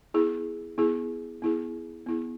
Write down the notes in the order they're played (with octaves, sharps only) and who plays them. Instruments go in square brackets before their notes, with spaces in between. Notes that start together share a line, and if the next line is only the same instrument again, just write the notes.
[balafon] B3 E4 G#4
B3 E4 G#4
B3 E4 G#4
B3 E4 G#4